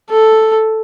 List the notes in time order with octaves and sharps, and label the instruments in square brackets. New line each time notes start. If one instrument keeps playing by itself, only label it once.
[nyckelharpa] A4